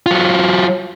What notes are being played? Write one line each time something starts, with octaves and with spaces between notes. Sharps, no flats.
F#3 F4